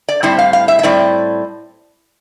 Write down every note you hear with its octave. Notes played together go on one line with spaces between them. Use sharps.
D5
A2 G3 C4 E4 C5
F5
F5
E5
E5
A2 G3 C4 E4 D5